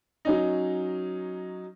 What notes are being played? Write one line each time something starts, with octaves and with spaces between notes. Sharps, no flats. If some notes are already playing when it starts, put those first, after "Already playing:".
F#3 C#4 D#4